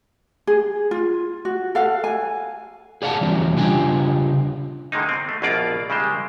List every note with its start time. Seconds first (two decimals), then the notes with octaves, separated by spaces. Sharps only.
0.47 G#4
0.91 F4
1.45 F#4
1.75 A4 F5 F#5
2.04 G#5
3.02 G#4 D5 F5 F#5 A5
3.21 E3 F#3 G3 C#4
3.56 C#3 D4 F4 G4 G#5
4.92 D3 D#3 G#3 A#3 D#4
5.09 C4
5.29 A3
5.42 A#1 B2 A#3 F4 D5
5.90 C#3 G3 G#3 C5